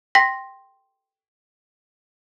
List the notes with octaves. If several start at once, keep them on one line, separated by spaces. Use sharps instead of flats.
G5 C6 A#6 B6